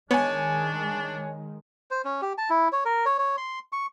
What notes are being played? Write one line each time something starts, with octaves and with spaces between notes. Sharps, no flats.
D#3 G#3 B3 D4 C#5 G#5
C5
C#4
G4
A5
E4
C#5
A#4
C#5
C#5
C6
C#6